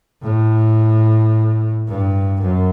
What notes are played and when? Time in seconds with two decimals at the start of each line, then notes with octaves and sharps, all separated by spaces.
0.23 A2
1.88 G2
2.41 F#2